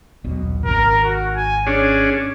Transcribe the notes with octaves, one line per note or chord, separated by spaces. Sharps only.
D#1 B1 B2
G#1 D#3 A#4
F#4
G#5
C#4 D4 G#4 C#5